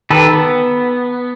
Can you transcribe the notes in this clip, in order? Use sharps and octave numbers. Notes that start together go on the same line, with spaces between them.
D#3 G4 A4 B4
B3